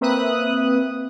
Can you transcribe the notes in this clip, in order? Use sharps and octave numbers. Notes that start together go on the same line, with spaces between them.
A#3 C4 B4 E5 D#6 F#6